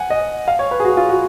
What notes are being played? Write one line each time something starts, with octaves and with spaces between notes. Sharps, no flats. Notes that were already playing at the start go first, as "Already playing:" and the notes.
Already playing: F#5 G#5
D#5
F5
C#5
B4
G#4
F#4
F4
F#4